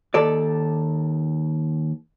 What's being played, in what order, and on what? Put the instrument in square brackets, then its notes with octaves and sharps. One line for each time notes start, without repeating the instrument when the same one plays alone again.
[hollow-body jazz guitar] D#2 A4 D5